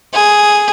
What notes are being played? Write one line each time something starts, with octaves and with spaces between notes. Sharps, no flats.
G#4